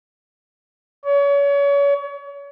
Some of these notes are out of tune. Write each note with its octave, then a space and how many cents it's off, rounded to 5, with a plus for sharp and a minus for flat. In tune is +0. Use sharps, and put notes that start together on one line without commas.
C#5 +35